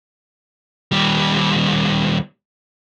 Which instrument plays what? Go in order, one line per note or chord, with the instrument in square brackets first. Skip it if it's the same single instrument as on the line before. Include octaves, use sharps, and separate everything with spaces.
[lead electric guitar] D#2 G3